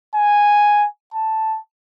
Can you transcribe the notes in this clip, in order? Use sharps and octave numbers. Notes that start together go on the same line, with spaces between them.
G#5
A5